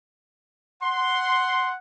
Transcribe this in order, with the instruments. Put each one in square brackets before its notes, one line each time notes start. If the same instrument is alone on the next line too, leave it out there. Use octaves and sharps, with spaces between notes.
[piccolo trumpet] F#5 [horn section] C6